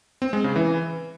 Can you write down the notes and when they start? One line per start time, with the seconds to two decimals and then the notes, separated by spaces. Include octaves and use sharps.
0.22 C4
0.33 G#3
0.44 C#3
0.56 E3